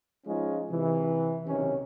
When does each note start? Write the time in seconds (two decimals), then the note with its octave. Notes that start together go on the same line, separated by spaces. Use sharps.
0.26 F3 G#3 C#4 D#4 F4
0.70 C3 E3
1.46 B1 C3 D#3 C#4